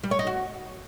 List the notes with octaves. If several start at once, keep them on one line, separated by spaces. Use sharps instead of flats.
G3
C#5
D#4
F#4